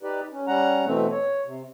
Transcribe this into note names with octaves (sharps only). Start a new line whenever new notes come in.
D#4 G4 B4 D5
C#4
G3 C#4 F#5 A#5
B2 E3 A3 C4
C#5
C3